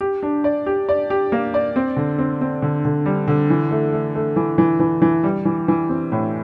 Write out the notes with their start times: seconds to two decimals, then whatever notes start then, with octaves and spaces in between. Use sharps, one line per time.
0.01 G4
0.23 D4
0.44 D5
0.66 G4
0.89 D5
1.10 G4
1.32 A#3
1.54 D5
1.76 C4
1.97 D3
2.18 C4
2.41 C4
2.62 D3
2.85 D3
3.06 G3
3.28 D3
3.50 E3
3.71 A3
3.93 A3
4.15 A3
4.36 E3
4.58 E3
4.80 E3
5.02 E3
5.23 G3
5.45 E3
5.68 E3
5.89 C4
6.12 A2